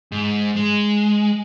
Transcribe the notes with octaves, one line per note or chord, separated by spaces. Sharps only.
G#2
G#3